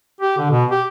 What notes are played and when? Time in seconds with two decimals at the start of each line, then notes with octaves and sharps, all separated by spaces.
0.21 G4
0.38 D3
0.51 B2
0.71 G4